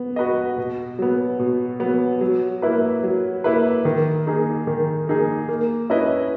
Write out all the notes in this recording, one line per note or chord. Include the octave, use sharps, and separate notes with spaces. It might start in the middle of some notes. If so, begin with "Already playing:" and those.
Already playing: B3
F#4 B4 D#5
B2
F#3 B3
B2
F#3 B3
F#3
A#3 E4 B4
F#3
A#3 E4 B4
D#3
A#3 D#4 G#4
D#3
A#3 D#4 G#4
A#3
C#4 E4 B4 D#5